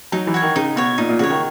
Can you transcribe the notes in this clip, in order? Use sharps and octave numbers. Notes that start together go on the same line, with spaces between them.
F#3 D#4
E3
F#4 C#5
D#3
C#3 D#4
B2 F#4 C#5
A#2 D#4
A#2
C#3 F#4 C#5
D#3